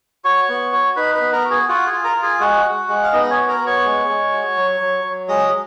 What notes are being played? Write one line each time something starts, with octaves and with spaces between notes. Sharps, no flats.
F#4 C#5 C#6
B3
F#4
D#4 B4 B5
B4 B5
B3
A#4 A#5
F#4
G#4 G#5
F4 F#4 F#5
G#4 G#5
F4
A#4 A#5
F4
G#4 G#5
G#3 F#4 F#5
F#4
G#3
F5
B3 D#4 D#5
D#5
C#4 C#5
F#4
A#4 A#5
B3
C#5 C#6
G#3
G#3
F#4
F#3
F#3
F#3
G#3 D#5 D#6